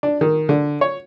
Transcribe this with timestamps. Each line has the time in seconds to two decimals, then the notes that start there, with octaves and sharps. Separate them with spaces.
0.03 D4
0.21 D#3
0.49 D3
0.81 C#5